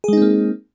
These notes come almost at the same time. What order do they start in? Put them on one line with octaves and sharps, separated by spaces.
G#4 G#3 D#4 C4 A#3